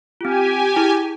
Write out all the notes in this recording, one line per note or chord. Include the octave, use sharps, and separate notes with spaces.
C4 F4 G4 G#5
E4 G#4